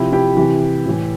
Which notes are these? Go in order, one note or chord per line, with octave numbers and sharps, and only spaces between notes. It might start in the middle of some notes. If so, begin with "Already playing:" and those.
Already playing: C3 F3 E4 G4
E4 G4
C3 E3
A2 E3